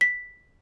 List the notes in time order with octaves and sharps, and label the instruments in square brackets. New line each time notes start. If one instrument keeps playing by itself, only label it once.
[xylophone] B6